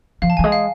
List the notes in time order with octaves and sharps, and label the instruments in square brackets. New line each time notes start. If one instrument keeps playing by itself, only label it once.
[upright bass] F3 [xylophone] F5
[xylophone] A5
[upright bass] F3 [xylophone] G#5
[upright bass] G#3
[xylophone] F5